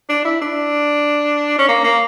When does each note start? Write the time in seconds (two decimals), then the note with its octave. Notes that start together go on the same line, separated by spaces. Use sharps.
0.09 D4
0.25 E4
0.41 D4
1.58 C#4
1.69 A#3
1.84 A#3